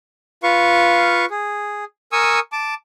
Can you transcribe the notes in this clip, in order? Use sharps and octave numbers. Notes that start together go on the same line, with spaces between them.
F4 B4 F5 C#6
G#4
A#4 G#5 C#6 D#6 E6
A5 D6